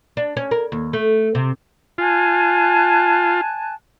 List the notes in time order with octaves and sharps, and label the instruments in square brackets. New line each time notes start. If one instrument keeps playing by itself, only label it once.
[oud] D4
C#4
A#4
D#2
A3
C3
[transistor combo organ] F4 [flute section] G#5 A5 F#6